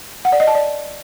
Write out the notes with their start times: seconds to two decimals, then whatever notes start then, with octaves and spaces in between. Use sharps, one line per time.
0.25 F#5
0.32 D5
0.40 D#5
0.47 A5
0.55 D5